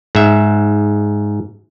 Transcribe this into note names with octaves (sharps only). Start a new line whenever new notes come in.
G#2 E5